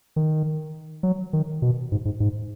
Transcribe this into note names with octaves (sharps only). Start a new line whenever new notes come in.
D#3
F#3
D#3
B2
G#2
G#2
G#2